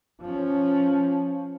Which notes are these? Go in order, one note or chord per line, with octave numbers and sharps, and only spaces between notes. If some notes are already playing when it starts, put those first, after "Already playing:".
F3 C#4